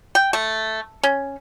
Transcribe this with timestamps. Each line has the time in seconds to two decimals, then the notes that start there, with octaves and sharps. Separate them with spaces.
0.15 G5
0.33 A3
1.03 C#4